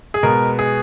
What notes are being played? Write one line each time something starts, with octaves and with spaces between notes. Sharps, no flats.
G#4
B2 G#3 B3 A#4
G#4